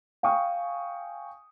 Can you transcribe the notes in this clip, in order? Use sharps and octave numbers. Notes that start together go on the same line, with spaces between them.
F5 G5 G#5 C#6 D#6